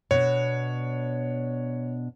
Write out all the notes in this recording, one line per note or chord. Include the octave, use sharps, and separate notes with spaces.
B2 D4 C#5